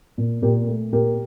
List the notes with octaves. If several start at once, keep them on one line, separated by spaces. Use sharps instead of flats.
A#2
A#2 G4 A#4
A3
A#2 G4 A#4